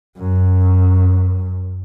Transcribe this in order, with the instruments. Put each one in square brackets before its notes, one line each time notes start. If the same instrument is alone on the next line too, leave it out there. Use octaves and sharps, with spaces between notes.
[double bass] F#2